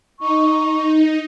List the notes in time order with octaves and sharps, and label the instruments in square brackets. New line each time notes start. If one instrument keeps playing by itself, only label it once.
[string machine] D#4 [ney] C#6